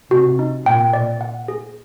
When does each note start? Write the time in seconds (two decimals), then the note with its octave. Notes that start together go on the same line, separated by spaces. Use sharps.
0.11 C3 F#4
0.39 D#4
0.66 A#2 G5
0.93 D5
1.21 F#5
1.48 G#4